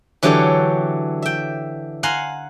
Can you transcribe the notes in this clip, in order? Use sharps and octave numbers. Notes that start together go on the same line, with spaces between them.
D3 E3 F#3 G4 A4 C#5
E5 G5
F5 F#5 G#5 A#5 C6